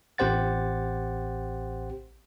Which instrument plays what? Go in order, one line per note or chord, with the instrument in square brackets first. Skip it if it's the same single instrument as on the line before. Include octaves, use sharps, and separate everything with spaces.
[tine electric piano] A1 C4 G4 C5 F#5 A6